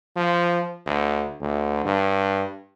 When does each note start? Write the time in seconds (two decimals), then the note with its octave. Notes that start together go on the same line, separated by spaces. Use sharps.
0.16 F3
0.86 D2
1.40 D2
1.85 G2